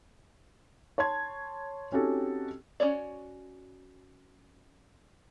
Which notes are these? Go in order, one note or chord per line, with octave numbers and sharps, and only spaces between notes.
C#5 A5 C6 G#6
C4 C#4 D#4 F#4 G4 A4
C#4 F4 F#4 C#5 D5